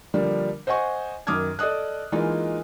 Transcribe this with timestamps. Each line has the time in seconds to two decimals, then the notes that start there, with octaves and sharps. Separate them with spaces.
0.14 D3 F3 G3 A#3 D4
0.67 C5 D#5 F#5 G#5 C#6
1.27 F#2 D#3 D6 D#6 F6 G#6
1.59 A4 D5 D#5 D#6 F#6
2.12 E3 G#3 A#3 D#4 F4